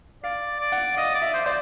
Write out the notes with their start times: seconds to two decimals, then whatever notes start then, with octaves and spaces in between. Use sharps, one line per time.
0.24 D5 F5
0.61 D5
0.72 F#5
0.97 D#5 F5
1.15 D5
1.22 E5
1.34 C5
1.45 C5 D5